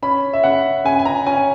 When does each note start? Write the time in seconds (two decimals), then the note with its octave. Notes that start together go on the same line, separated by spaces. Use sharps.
0.03 C#4 B5
0.33 E5
0.44 C#3 F#5
0.84 C#3 G#5
0.99 G#5
1.05 A#5
1.27 C#4 G#5